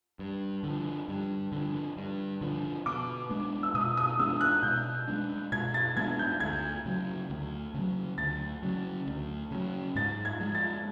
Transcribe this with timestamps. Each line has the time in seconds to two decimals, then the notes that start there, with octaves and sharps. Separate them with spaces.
0.19 G2
0.63 D3 F3
1.08 G2
1.52 D3 F3
1.97 G2
2.41 D3 F3
2.86 B2 D6
3.30 G#3 B3 D4
3.63 E6
3.74 B2 D#6
3.97 D#6
4.19 G#3 B3 D4 E6
4.41 F#6
4.63 B2 G6
5.08 G#3 B3 D4
5.52 B2 G#6
5.74 A6
5.96 G#3 B3 D4 G#6
6.19 G6
6.40 D2 G#6
6.85 C#3 F#3
7.30 D2
7.74 C#3 F#3
8.18 D2 A6
8.63 C#3 F#3
9.07 D2
9.51 C#3 F#3
9.95 G#2 A6
10.25 G#6
10.40 F3 G#3
10.55 A6